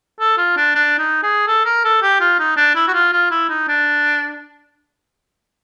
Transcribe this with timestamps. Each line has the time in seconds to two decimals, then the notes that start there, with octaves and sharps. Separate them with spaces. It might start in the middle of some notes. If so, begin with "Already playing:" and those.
0.20 A4
0.38 F4
0.57 D4
0.75 D4
0.99 D#4
1.23 G#4
1.47 A4
1.66 A#4
1.85 A4
2.03 G4
2.20 F4
2.39 D#4
2.57 D4
2.75 E4
2.88 F#4
2.94 F4
3.13 F4
3.31 E4
3.50 D#4
3.68 D4